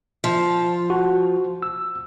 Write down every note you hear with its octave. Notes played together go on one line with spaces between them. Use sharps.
F3
F#4
E6